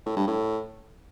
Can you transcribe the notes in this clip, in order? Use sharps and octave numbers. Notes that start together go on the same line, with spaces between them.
A2
G2
A2